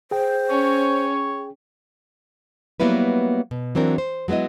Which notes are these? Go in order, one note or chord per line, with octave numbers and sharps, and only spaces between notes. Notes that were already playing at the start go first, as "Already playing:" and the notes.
G#4 C5 G5
C#4 C#5
F#3 G3 A#3 B3 E4 B4
B2
E3 F#3 C4 D4 A#4
C5
F#3 G#3 B3 E4 D#5